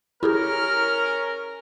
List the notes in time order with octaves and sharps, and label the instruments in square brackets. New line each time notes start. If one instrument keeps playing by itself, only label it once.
[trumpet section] C#4 A#4 [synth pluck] E4 G4 G#4 [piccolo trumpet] F6